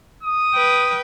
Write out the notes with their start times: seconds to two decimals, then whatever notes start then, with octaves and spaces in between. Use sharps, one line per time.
0.23 D#6
0.54 B4 G5